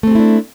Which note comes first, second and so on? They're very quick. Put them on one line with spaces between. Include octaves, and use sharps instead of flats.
A3 C4 G#4 E4 D4